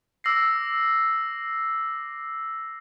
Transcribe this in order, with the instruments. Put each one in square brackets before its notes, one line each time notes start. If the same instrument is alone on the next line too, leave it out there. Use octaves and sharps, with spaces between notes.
[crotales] D6 E6 A#6 C7